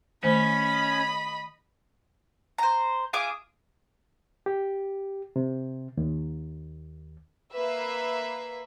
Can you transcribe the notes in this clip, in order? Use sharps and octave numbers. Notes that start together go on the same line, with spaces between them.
D#3 A3 C#4 C5 D#5 B5
C5 A#5
F4 G#4 E5 D6
G4
C3
D#2
A#3 B4 E5